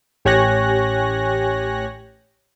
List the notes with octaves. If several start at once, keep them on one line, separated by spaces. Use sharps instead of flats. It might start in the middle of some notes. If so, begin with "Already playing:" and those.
A1 G4 C#5 G#5 F#6 A#6